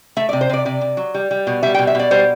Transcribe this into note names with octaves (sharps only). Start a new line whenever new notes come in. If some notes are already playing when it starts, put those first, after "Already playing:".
A3 E5
D5
C3
C5
C3 D5
C3 D5
C3
F#3
G3
G3
B2
G3 E5
G5
B2
E5
B2 D5
G3 C5